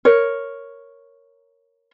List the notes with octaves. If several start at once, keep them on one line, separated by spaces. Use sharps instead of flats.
A#4 C#5